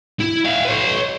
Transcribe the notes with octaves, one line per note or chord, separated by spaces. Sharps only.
E4
E5 F5
B4 C#5